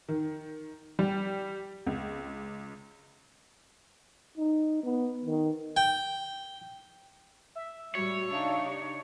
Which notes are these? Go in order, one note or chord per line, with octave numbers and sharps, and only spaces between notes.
D#3
G3
C#2
D#4
B3
D#3
G5
E5
A2 G3 F#4 C#5
C#3 D4 D#4 F5 A5 C#6
G4